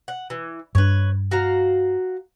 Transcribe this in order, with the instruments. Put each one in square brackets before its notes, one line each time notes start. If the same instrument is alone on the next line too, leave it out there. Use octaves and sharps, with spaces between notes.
[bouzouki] F#5
E3
[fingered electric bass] G2 D4 [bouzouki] B4 C#5
[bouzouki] F#4 F5 A#5